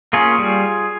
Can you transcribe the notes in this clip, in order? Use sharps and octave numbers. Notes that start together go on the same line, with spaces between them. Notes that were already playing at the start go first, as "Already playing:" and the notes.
A#3 C#4 F4 G#4
G3